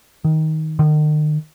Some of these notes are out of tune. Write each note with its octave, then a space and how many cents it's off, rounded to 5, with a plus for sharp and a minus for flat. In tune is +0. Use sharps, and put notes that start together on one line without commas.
D#3 +15
D#3 -40